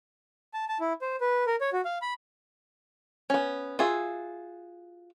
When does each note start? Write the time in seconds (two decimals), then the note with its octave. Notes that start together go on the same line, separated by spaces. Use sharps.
0.54 A5
0.68 A5
0.80 E4
1.02 C5
1.21 B4
1.47 A#4
1.61 C#5
1.73 F#4
1.85 F5
2.02 B5
3.30 B3 C#4
3.79 F4 F#4 G#4 E5